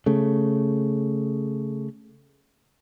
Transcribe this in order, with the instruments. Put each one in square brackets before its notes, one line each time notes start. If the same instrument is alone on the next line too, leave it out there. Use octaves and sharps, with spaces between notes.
[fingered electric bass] C#3 A3